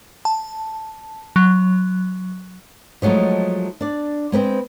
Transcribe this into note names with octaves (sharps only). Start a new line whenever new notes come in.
A5
F#3
F3 F#3 G#3 A3 D#4
D4 D5
G#3 C4 B4 C5